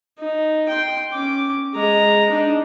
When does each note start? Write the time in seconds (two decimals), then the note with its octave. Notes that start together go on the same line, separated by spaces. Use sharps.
0.19 D#4
0.69 G5 C6
1.11 C#4 D6
1.74 G#3 A#5
2.30 D4 D#4